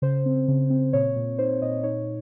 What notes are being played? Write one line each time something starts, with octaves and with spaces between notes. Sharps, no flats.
C#3 C5
C4
C#3
C4
A#2 C#5
A#2
D#4 C5
A#2 D#5
D#4 C#5